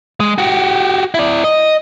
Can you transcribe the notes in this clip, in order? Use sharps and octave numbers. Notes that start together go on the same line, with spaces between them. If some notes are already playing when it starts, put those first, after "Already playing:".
G#3
F#4 G4
E4 D5
D#5